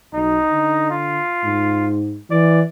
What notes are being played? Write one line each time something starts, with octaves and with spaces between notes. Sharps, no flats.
B1 D#4
D3
F4
G#2
E3 D5